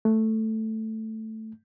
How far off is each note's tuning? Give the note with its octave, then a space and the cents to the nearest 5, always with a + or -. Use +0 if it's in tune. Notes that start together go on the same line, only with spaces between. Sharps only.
A3 +5